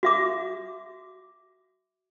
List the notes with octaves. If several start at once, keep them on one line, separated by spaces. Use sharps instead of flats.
F#4 E5 D6